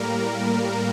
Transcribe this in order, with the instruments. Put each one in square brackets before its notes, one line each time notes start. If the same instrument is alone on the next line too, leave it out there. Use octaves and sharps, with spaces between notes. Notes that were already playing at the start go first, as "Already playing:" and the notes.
Already playing: [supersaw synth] A2 G3 A#3 A#4